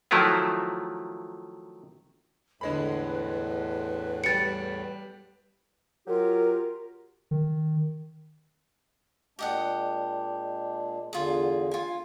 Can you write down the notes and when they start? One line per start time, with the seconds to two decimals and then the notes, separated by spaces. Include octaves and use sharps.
0.11 D#3 F3 F#3 A3 E4 F4
2.61 E2 A2 D3 G#3 B4 B5
4.24 G3 A6 C#7 D7
6.07 F#3 F4 G4 A#4
7.31 D#3
9.39 A#2 G#3 D4 G4 D#5 F#5
11.13 E2 D3 F4 G#4
11.71 F4 G#5